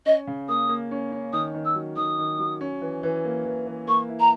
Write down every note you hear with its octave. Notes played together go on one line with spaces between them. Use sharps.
C#4 D#5
C#3
A#3 D#6
A#3
C#4
C#4
D#3 D#6
D#3
E6
F#3
D#3 D#6
D#3
F#3
C#4
E3
E3
A#3
E3
E3
A#3 C#6
E4
A#5